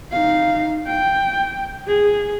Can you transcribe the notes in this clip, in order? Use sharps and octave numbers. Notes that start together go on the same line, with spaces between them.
D#4 F5
G5
G#4